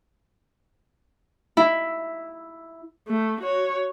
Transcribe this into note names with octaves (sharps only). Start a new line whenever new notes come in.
E4
A3
F#4 C#5